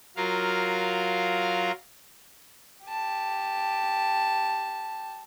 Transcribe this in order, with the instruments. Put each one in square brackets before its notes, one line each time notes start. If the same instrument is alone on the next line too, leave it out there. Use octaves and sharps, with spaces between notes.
[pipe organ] F#3 F4 A#4 F5
[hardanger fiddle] G4 A5